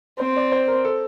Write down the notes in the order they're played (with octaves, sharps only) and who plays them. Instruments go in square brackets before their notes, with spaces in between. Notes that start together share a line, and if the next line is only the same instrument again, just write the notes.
[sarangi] C4 [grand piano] C5
[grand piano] D5
C5
A#4
A4